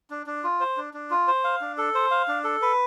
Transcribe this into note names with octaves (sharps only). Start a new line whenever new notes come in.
D4
D4
F4
C5
D4
D4
F4
C5
F5
D4
A4
C5
F5
D4
A4
B4